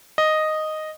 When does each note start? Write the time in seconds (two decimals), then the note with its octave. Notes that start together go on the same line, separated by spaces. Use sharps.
0.18 D#5